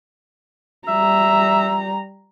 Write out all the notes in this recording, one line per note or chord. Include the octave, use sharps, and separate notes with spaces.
G3 E5 A#5